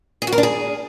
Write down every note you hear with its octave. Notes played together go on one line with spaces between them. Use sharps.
G#4
F#4
A#4
D4
G#4